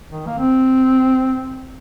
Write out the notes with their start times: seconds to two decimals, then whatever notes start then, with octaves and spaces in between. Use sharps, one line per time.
0.11 D#3
0.27 A#3
0.39 C4